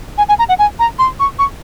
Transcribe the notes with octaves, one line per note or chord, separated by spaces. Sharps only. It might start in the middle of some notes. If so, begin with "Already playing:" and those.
G#5
G#5
A#5
F#5
G#5
A#5
C6
C#6
C#6